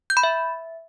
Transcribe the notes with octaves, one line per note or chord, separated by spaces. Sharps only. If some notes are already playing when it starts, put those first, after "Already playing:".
G6
B5
E5